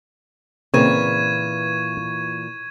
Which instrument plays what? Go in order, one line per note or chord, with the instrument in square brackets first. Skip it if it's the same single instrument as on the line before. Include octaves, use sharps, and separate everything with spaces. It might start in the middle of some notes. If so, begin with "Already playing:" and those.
[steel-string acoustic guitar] A#2 E3 [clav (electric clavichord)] C#3 C4 A#4 [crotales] C#6 G#6 D#7